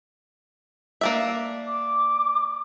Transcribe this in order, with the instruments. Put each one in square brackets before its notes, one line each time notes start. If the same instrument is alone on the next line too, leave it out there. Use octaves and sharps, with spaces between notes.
[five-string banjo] A#3 D4 E5
[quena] D6